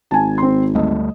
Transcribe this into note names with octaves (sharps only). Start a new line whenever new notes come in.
G#1 G#5 A5
C4 C6
D2 G3 A3 D#5